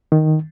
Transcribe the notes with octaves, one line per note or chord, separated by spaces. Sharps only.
D#3